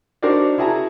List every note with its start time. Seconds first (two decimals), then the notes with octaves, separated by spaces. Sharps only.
0.22 D4 D#4 F#4 A#4 C5 D5
0.58 E4 F#4 G#4 A5 A#5